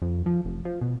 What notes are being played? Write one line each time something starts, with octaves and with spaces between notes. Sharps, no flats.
F2
F3
F1
F3
B2